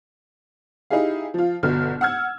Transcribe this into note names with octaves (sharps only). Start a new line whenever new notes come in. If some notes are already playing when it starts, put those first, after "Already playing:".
D#4 E4 G4 G#4 F5
F3 F4
G1 B2 D3 F6
F#5 E6 F6 G#6